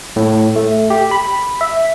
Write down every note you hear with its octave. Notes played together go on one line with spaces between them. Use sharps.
A2
A3
G4
B5
E5